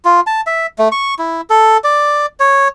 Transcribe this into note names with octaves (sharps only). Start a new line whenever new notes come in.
F4
A5
E5
A3
C#6
E4
A4
D5
C#5